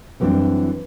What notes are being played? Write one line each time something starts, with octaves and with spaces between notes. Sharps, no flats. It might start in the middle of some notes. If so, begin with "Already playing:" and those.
F#2 E3 G3 A3 C4 D4